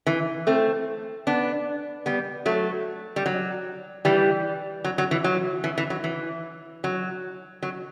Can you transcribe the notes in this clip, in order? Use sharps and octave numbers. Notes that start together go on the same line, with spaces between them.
E3
A3 C4
B3 D4
G3 B3
F#3 A3
G3
F#3
E3 G3
F#3
F#3
E3
F#3
E3
E3
F#3
E3
F#3
F#3